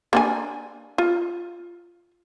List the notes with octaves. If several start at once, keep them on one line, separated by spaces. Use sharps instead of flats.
A#3 D4 G#5
F4